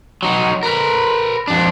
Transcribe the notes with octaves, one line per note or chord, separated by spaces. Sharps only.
F#3 D#4
A#4 B4
F2 D4